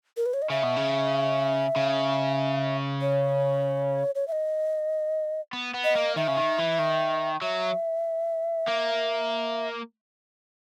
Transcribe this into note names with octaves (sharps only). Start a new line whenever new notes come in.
A#4
B4
C#5
D#5
C#3 E5
B2
C#3
C#3
C#5
C#5
E5
D#5
B3
B3
D#5
A#3
D#3 E5
C#3
D#3
E3
D#3
F#3 E5
A#3